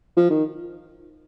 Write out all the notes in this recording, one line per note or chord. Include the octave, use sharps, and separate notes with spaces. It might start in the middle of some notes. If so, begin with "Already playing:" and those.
F3
D#3